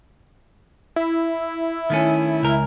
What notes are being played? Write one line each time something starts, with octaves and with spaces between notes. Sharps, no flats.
E4
D#3 A3 C#4
C#2 A#4